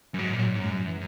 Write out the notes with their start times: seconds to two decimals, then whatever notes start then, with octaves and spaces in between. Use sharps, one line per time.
0.14 F#2
0.19 G#2 F#3
0.33 A#2
0.39 F#3
0.46 G#2
0.59 F#2 G#3
0.73 F#3
0.86 E3